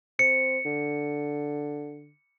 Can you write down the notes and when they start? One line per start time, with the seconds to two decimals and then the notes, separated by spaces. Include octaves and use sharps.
0.19 C4 C#7
0.65 D3